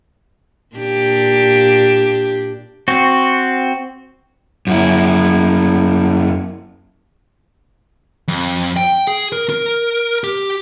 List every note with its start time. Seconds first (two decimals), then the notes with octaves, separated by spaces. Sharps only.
0.76 A#2 D4 G4
2.88 C4 F#4
4.67 F#2 E4
8.28 F2
8.77 G5
9.07 G#4
9.32 A#4
9.49 A#4
10.24 G4